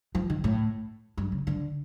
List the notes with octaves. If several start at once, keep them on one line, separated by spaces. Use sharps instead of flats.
F3
D#3
A2
G2
C#3
D3